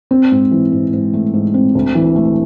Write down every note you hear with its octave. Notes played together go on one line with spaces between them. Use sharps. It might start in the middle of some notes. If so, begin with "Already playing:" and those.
C4
G#2
E3
G#2
G#2
A3
G#2
C4
D2
E3
A3